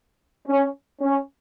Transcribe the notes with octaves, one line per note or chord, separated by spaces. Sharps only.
C#4
C#4